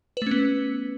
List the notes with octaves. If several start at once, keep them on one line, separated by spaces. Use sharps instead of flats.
A3 B3 C#4 B4